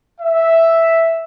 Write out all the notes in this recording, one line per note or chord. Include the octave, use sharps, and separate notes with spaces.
E5